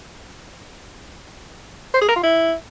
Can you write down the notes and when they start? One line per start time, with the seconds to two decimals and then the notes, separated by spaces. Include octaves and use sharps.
1.94 C5
2.01 G#4
2.09 A#4
2.16 F4
2.23 E4